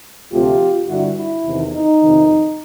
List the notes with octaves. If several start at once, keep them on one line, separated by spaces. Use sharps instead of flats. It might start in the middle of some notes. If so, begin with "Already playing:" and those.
D2 C3 F3 A3 C4 F4 G4
G2 D3 G3 E4 F#4
E4
E2 C3 D#3
D#4
F2 C3 D#3